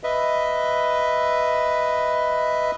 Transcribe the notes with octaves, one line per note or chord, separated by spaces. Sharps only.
B4 D#5 E5